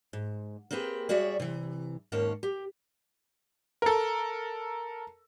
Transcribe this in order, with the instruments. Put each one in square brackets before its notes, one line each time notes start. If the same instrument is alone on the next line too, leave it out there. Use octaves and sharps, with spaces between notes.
[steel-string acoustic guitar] G#2
A#3 C4 G4 G#4 B4
G3 F#4 G#4 C#5 D5 E5
C3 E3
D#2 G#2 A#3 C#4 C#5 A5
G4
[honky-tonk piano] A4 A#4